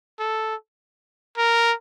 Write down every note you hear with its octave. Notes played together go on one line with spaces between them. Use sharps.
A4
A#4